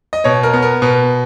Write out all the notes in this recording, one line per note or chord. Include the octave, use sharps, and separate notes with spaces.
D#5
B2 C#5
A#4
B3
A#4
B2 B4